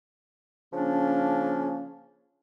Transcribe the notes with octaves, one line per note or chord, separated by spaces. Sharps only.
C#3 F3 A#3 C#4 D4